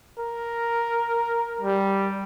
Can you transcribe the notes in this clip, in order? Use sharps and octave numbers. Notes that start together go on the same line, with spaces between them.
A#4
G3